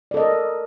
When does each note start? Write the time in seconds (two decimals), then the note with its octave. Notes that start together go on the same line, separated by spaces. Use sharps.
0.11 D5
0.14 A4
0.17 D#5
0.20 A#4